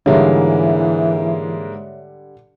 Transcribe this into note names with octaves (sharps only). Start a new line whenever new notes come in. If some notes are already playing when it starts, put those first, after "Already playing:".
G#2 D3 E3 G3 G#3 A#3 C#5 E5